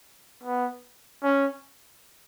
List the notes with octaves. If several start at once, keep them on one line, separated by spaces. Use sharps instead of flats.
B3
C#4